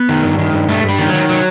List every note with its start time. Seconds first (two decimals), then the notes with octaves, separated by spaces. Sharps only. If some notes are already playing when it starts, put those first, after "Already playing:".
Already playing: B3
0.09 D#3
0.23 G2
0.39 D#3
0.53 G2
0.68 G2 A3
0.83 G2
0.89 G3
0.99 D#3
1.09 D#3 F#3
1.29 F#3